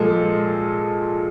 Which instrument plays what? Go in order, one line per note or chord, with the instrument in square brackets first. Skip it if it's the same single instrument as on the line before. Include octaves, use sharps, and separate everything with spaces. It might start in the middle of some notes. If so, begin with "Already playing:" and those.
Already playing: [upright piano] A#2 F3 G#3 A4